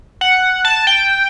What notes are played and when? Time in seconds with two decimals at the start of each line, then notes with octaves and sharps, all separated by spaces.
0.21 F#5
0.65 A5
0.87 G5